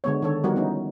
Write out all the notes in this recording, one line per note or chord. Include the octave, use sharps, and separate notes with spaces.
D3 G#3 B3 C#5
D#3 D4 A4 C#5
F3 G3 B3 D#4 F#4 A#4
B3 C#4 D#4 E4